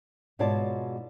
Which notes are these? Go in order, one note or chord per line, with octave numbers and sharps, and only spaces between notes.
G#2 B2 F4 C#5 D5 A5